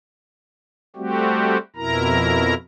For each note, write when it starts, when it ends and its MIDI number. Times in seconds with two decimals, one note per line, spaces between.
0.96 1.58 55
0.96 1.58 57
0.96 1.58 60
0.96 1.58 66
0.96 1.58 67
1.76 2.54 41
1.76 2.54 47
1.76 2.54 64
1.76 2.54 70
1.76 2.54 82